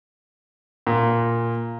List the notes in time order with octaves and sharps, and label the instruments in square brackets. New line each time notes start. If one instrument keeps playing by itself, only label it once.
[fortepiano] A#2